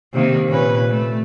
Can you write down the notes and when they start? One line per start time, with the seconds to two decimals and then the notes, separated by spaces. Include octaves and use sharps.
0.14 C3 D#3 A#3
0.47 A#2 C#4 B4
0.89 A3